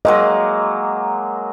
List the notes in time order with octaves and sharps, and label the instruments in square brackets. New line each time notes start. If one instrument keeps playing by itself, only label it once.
[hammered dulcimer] F#3 G#3 A#3 [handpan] D#5